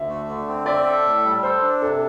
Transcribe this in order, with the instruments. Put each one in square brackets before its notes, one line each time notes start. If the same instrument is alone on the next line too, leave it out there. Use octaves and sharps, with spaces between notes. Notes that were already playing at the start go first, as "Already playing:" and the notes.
Already playing: [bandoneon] D2 [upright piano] E5
[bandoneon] A3
D3
C4
[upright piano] D5 [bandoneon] E5
[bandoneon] A4
A2
G3
[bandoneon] A4 [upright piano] C5
[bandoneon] D4
[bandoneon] C3 [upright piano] A4